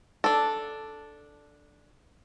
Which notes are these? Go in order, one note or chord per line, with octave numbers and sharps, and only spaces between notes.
D4 A4